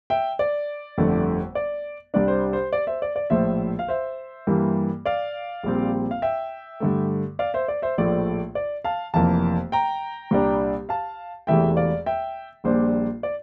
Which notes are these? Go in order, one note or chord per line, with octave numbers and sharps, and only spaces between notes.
E5 G5
D5
G1 F2 D3 A3
D5
C2 C3 G3 D4 D5
C5
C5
D5
C5 E5
D5
D5
A#1 A2 F3 C5 E5
F5
C5 E5
G2 E3 G3 A#3
D5 F5
A#1 A#2 G3 C4
F5
E5 G5
G2 D3 A3
D5 F5
C5 E5
D5
C5 E5
A#1 A2 F3 A3 D5
D5
F5 A5
F1 F2 E3 A#3 F5 A5
G5 A#5
C2 A#2 G3 D4
F5 A5
E1 E2 C3 E3 A3 E5 G5
D5 F5
E5 G5
A#1 A#2 G3 D4 C5
D5